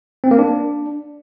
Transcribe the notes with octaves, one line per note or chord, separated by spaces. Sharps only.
C4
A#3
D4